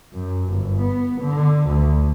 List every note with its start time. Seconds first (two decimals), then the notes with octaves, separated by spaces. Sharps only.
0.14 F#2
0.49 G1
0.82 B3
1.22 D3
1.68 D2